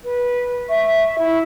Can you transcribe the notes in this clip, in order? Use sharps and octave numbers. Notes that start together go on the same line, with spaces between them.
B4
E5 C#6
E4